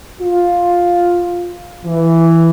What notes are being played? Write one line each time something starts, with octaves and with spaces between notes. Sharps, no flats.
F4
E3